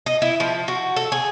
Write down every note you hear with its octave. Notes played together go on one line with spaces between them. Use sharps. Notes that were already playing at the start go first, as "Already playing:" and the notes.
D#5
E4
F3
F#4
A4
G#4